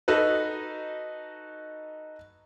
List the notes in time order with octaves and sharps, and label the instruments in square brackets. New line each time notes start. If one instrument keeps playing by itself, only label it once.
[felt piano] D#4 F#4 A4 B4